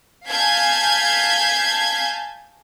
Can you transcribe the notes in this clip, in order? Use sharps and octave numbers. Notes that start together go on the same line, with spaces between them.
F5 G#5 A5 G6 G#6 B6